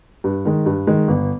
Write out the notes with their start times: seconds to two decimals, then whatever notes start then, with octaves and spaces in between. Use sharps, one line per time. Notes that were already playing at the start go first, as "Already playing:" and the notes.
0.24 G2
0.45 D#3 G#3
0.66 G2
0.87 D#3 G#3
1.08 G1